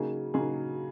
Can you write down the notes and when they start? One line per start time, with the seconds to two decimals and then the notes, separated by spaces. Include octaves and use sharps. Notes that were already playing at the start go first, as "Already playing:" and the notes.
Already playing: C#3 F#3 A#3 D#4 G#4
0.34 C#3 F#3 A#3 D#4 G#4